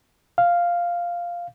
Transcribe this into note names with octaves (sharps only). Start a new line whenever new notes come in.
F5